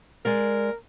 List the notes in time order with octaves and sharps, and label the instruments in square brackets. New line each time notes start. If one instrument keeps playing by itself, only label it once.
[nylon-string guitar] G#3 D5 F5 [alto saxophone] A#4